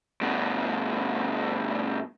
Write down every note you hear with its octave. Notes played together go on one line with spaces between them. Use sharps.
G2 B2